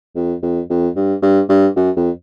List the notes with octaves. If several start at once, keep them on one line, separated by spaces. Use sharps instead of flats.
F2
F2
F2
G2
G2
G2
F#2
F2